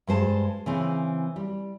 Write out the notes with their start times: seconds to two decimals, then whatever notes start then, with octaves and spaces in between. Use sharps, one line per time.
0.07 G2 G#3 C5 A5
0.66 C#3 E3 C4
1.36 G3